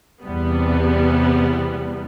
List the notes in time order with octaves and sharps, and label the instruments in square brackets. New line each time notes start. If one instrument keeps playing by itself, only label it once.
[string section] E2 C3 G3 B3